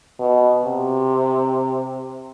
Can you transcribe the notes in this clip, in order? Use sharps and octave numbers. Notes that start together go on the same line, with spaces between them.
B2
C3